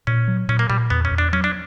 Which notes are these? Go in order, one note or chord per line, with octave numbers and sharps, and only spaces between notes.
A#2 C#4
F#3
A#2 C#4
A#3
A#2 G3
E2 B3
C#4
E2
D4
F#3 C#4
D4